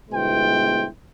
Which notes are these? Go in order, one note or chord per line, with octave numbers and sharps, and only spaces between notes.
G1 B2 G#3 E4 C5 G5